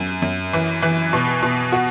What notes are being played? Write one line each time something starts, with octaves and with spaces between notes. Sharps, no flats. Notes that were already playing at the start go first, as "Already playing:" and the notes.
Already playing: F#2
F#2
E3
E3
B2
B2
F#4